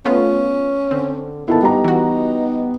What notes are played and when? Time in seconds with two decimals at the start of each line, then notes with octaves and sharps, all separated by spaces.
0.05 A3 B3 C#4 F4
0.91 D3 C4
1.48 D#3 B3 E4 A4 A5
1.62 G3 D#4 A#5
1.84 E3 F#4